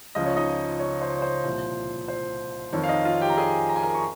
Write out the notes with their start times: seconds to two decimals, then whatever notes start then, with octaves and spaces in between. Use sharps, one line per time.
0.15 C#2 C#3 F3 D#5
0.26 C#5
0.36 D#4 D#5
0.79 C#5
1.02 C5
1.17 C#5
1.22 C5
1.44 C2 A#2 F3
2.08 C5
2.73 F2 D#3 C#5
2.84 F5
2.89 D#4 D#5
3.05 F4 F5
3.21 G4 G5
3.29 A#5
3.38 G#4 G#5
3.69 A#5
3.76 G#5
3.83 A#4 A#5
3.95 C#6